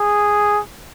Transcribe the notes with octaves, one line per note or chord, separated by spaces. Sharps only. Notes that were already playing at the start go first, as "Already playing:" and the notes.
Already playing: G#4